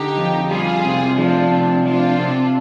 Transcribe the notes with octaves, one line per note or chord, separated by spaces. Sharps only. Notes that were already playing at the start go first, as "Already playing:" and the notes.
Already playing: D3 D#4 G4
F2
G3 F4 G#4
C3
F3 D4 F4
C3
F3 D4 F4
C3